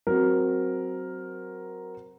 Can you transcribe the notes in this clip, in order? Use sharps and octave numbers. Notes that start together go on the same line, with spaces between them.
F#3 C4 A#4